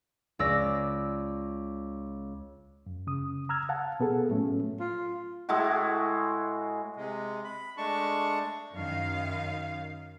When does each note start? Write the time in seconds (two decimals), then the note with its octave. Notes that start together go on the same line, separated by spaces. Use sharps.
0.39 C#2 D5 E6 A#6
2.86 F#2
3.07 C#3 D#6
3.49 A#5 E6 F6 G#6
3.69 F5 F#5 A5
4.00 B2 B3 G#4 A4
4.29 A2 F#3 A3 C#4
4.80 F4
5.49 A2 G#3 E4 F#4
6.96 C3 G#3
7.44 B5
7.78 G#3 A3 D4 A5 C#6
8.74 F#2 D#3 F5